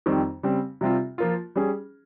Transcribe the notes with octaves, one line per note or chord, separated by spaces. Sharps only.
F2 D#3 G3 C4
C#3 G3 C4
C3 G3 C4 F4
F3 A#3 F4
G3 C#4 G#4